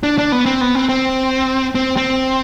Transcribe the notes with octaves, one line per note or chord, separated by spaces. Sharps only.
D4
D4
B3
C4
B3
C4
C4
C4
C4